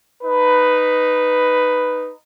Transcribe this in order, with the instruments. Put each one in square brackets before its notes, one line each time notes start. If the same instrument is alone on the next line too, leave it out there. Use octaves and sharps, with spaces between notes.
[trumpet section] D#4 B4